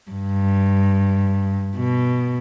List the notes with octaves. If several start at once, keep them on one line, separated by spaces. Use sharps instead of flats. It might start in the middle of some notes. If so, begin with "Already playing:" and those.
G2
B2